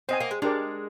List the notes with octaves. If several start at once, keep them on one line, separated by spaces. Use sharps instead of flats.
C4 C5 D#5 G#5
A#3
G#3
G#3 D4 G4 A#4 D5